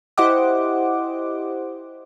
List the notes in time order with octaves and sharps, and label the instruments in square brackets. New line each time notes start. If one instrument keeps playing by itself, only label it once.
[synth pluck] E4 G4 C5 D#5 F#5 D6